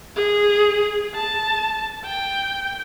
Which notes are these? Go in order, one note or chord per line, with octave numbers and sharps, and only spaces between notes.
G#4
A5
G5